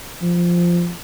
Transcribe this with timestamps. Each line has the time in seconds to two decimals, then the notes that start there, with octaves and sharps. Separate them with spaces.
0.22 F3